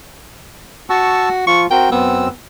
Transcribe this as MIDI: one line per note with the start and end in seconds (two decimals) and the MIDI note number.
0.90 1.43 66
0.90 1.29 81
0.90 1.29 85
0.90 1.29 88
1.47 1.67 53
1.47 1.67 65
1.47 1.63 85
1.71 1.89 60
1.71 1.89 66
1.71 1.89 70
1.71 1.89 79
1.92 2.29 42
1.92 2.31 59
1.92 2.29 60
1.92 2.29 88